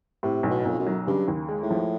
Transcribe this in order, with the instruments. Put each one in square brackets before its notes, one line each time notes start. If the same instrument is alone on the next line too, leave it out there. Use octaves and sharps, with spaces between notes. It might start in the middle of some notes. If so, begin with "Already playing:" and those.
[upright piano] A2 [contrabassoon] C3
[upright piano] B1
[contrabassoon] B2
[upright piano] B1
[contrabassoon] F2
F#2
[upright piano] F#3
[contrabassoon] G2 [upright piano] C#3
[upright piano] D#2
G#3
[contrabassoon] A2
[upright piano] F3